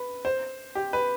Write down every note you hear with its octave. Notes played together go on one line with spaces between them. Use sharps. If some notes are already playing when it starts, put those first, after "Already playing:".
Already playing: B4
C5
G4
B4